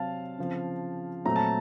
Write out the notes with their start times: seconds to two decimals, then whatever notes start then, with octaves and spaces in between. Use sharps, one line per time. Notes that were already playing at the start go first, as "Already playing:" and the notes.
Already playing: C3 F#3 C4 F5 A5
0.39 C#3 F3 C4
1.25 A#2 F#3 A3 C4 A#5
1.36 A5